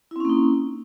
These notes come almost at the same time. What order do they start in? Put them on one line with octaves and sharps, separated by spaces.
E4 C4 C#4 A#3 D#4